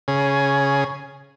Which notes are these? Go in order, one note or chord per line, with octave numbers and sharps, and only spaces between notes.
C#3 G#4